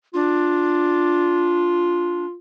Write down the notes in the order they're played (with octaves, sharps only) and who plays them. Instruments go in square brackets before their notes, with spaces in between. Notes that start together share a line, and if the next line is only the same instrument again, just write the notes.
[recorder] D4 [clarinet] F4